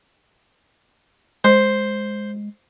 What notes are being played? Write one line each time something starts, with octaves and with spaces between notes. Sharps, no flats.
G#3 C5